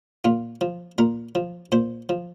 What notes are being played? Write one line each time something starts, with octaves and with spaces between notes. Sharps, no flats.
A#2 F4
F3
A#2 A#4
F3
A#2 C5
F3